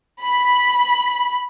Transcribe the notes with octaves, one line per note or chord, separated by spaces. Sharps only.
B5